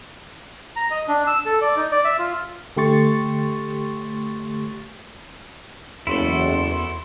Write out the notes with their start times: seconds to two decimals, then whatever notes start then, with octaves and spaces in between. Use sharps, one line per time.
0.76 A#5
0.91 D#5
1.08 D4
1.27 E6
1.46 A4
1.61 D5
1.76 D#4
1.92 D5
2.05 E5
2.19 F4
2.77 D3 A3 G4 C6 C#6 A6
6.07 F#1 E2 E4 F#4 A4 C6